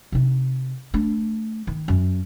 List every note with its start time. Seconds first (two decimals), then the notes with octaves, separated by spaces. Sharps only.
0.12 C3 D#4
0.94 A3 D4
1.67 D#3
1.88 F#2